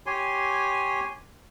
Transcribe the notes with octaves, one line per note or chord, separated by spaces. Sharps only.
G4 C#5 G#5 C6